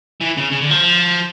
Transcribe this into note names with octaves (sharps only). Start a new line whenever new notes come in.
E3
C#3
C#3
D3
F3